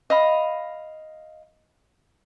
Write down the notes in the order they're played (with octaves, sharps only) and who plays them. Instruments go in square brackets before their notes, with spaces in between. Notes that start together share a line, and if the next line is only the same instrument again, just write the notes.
[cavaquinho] D#5 F5 B5